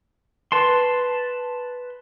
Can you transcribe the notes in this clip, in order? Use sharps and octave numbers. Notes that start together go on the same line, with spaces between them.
B4 A5 C6